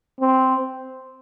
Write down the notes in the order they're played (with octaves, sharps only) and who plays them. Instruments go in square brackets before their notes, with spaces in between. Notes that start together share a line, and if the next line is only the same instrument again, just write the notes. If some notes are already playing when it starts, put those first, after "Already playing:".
[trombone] C4